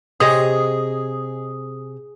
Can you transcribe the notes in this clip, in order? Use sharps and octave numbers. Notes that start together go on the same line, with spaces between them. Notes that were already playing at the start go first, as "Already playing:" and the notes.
C3 G4 G#4 C5 C#5 D#5 D#6